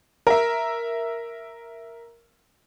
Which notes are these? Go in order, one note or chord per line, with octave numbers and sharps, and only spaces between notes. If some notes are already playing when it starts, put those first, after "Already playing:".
A#4 E5